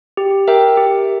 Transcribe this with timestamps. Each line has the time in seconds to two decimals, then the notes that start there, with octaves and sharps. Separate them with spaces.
0.17 G4
0.48 A#4 E5 G5
0.77 G4